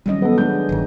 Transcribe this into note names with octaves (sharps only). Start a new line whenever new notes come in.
D#3 F#3 G3 A#3 C#4 D#5
B3 A4
G#3 B3 D4 G6
E1 G2 D#3